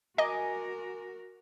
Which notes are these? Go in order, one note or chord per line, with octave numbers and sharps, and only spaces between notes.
F#4 A#4 D#5 G#5 A#5 D6